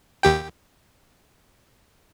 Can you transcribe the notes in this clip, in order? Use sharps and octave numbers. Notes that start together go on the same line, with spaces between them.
D#2 G4 G5